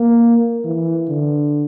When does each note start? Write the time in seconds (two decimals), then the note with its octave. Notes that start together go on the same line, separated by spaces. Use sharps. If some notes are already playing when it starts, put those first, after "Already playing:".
Already playing: A#3
0.65 E3
1.08 D3